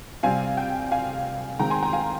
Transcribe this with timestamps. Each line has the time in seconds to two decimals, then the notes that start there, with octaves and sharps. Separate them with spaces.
0.23 C3 G3 C4 F5 G#5
0.57 G5
0.92 F5 G#5
1.59 D#3 G#3 C4 G5 A#5
1.70 G#5 C6
1.82 G5 A#5
1.93 F5 G#5